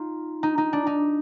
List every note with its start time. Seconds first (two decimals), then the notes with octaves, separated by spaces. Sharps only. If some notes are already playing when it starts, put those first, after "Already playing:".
Already playing: D#4 F4
0.43 D#4
0.58 D#4
0.73 D4
0.87 D#4